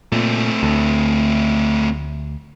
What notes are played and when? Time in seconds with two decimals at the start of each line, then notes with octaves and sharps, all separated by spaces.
0.12 A#2 A3 C4
0.63 D2